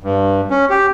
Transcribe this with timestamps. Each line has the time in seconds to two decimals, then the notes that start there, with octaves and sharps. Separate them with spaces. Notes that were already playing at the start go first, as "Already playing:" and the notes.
0.03 G2
0.50 C#4
0.70 G4